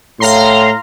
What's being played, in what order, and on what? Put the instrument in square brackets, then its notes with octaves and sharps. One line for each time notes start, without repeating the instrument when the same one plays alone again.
[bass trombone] A2 [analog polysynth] F5 A#5 C6